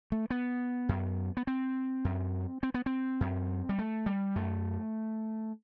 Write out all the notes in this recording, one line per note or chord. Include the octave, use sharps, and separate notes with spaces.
A3
B3
F#2
B3
C4
F#2
C4
B3
C4
F#2
G3
A3
G3
F#2 A3